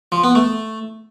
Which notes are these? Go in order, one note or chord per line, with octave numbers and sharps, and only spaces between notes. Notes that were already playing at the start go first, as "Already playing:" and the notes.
F3
B3
A3